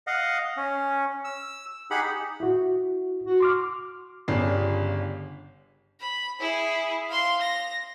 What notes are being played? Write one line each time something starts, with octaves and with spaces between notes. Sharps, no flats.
D#5 F5 F#5
C#4
E6
D#4 G4 G#4 F#5 B5
E4 F#4
F#4
C6 D6 F6
G1 C#3 D4 G4 C7
B5
E4 G#4
F5 C6
A#6